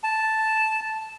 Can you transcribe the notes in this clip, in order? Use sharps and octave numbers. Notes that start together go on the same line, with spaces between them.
A5